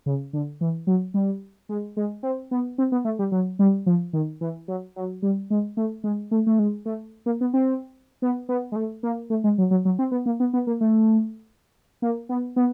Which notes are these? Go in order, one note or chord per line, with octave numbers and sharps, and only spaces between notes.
C#3
D3
E3
F#3
G3
G#3
G#3
C4
B3
C4
B3
A3
G3
F#3
G3
F3
D#3
E3
F#3
F#3
G3
G#3
A3
G#3
A3
A3
G#3
A3
A#3
B3
C4
B3
B3
G#3
A3
A#3
A3
G#3
F#3
F#3
F#3
C4
B3
A#3
B3
B3
A#3
A3
A#3
B3
B3